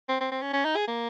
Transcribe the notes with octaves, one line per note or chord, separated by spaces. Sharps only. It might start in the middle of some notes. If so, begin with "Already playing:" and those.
C4
C4
C4
C#4
C#4
D#4
G#4
A#3